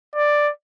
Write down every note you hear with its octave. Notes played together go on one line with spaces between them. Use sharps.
D5